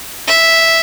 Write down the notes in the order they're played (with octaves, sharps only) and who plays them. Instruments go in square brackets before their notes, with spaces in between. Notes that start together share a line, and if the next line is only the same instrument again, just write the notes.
[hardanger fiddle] E5